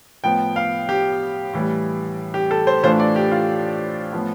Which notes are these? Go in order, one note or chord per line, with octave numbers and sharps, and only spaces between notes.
A2 F3 B3 G5
F5
G4
A2 E3 G3
G4
A4
C5
A2 E3 A3 D4 F4 C5
D5
G4
F4
A2 F3 B3